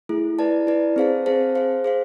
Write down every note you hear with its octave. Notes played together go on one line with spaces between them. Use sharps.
A3 E4 G#4
E4 B4 D5 A5
E4 B4 D5 A5
C4 G#4 C5 F5 A5
C4 G#4 C5 F5 A5
G#4 C5 F5
G#4 C5 F5